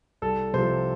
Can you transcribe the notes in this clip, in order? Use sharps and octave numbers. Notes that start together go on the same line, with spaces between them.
C2 A4
C3 F3 C5